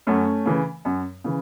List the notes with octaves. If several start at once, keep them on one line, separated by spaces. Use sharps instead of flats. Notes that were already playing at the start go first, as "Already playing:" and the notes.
F#2 A3 C#4
C#3 E3
F#2
C#3 E3